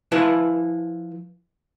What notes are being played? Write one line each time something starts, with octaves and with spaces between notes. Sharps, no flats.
F3 E4 B4 A5